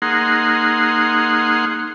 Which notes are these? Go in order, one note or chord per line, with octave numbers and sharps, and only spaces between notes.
A#3 D#4 G#4 F#5 C6